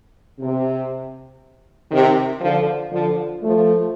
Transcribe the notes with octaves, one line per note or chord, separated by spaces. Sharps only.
C3
C3 D#3
D3 F3
D3 F3
F3 A3